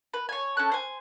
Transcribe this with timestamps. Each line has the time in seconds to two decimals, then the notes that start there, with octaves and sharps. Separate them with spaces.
0.14 B4
0.29 C#5 G#5
0.57 C#4 A4 F#6
0.72 C5 G#5